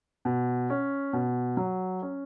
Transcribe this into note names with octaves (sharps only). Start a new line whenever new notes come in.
B2
C#4
B2
F#3
C#4